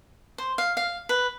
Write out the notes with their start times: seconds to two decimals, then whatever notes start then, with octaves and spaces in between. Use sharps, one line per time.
0.38 C5
0.58 F5
0.77 F5
1.09 B4